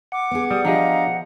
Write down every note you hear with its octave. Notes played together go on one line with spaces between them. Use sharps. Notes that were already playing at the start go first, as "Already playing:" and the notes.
F#5 D6
B3 G#4
G3 D#6
F3 D4 G4 G#4 D#5 F5 A#5